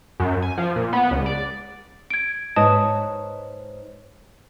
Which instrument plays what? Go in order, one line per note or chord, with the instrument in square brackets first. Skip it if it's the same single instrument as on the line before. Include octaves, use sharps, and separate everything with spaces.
[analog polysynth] F#2
G#5
F3
A#2
B3
C#2
D5
[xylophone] G#6 D7
[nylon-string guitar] G#2 B4 C#5 [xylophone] D#5 A5 D#6